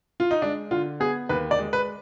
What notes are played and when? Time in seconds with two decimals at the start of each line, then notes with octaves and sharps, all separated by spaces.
0.20 F4
0.31 D#4
0.42 G#3 D4
0.71 D3 F4
1.00 B3 G#4
1.29 D#2 B4
1.51 D5
1.59 G#3
1.73 B4